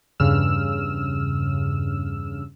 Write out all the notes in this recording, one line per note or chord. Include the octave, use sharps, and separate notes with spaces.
E2 G2 C#3 E6 F6 E7